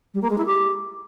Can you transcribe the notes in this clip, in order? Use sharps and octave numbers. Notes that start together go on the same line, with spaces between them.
G3
A#3
G#3
E4
G4